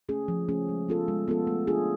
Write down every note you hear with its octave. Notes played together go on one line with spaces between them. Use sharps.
A3 C#4 G#4
F3
A3 C#4 G#4
G#3
B3 F4 A4
G#3
B3 F4 A4
A3
D4 F4 G#4